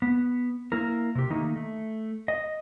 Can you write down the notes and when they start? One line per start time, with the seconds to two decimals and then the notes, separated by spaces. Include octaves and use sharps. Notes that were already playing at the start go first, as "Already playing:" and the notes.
0.02 B3
0.72 A#3 E4 A#4
1.15 C3 G4
1.30 D#3 A3 A#3 D#4
1.56 A3
2.28 D#5